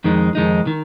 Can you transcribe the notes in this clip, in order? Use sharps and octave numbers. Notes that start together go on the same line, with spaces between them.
F2 D#3 G#3 D#4
F2 D#3 G#3 D#4
D#3